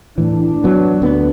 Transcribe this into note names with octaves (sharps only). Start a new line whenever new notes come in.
A2 E3 D4
F#3 B3
D2 B3